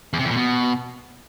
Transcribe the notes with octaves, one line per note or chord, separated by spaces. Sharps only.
E2
C3
E2
A#2
B2